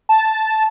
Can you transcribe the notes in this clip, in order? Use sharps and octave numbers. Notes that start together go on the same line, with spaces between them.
A5